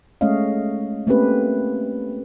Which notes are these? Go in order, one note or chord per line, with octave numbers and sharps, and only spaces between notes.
G#3 A3 C#4 C#5 D#5 F5
A3 A#3 C4 C#4 G4 B4